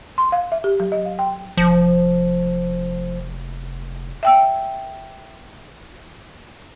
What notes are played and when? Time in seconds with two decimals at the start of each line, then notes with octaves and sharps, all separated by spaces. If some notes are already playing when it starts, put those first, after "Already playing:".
0.18 C6
0.32 F5
0.52 E5
0.64 G4
0.80 F#3
0.92 D#5
1.06 F5
1.19 G5
1.57 F1 F3
4.23 E5 G5 E6